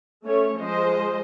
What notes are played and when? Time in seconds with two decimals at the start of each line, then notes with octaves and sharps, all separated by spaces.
0.24 A3 C#4 C#5
0.58 F3 G#3 C5 D#5